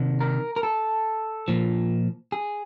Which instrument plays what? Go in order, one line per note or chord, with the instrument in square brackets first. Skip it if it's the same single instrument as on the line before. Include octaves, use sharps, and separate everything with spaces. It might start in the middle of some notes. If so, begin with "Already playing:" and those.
Already playing: [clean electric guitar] C3 D#3
A#4
A#4
A4
A#2 F3
G#4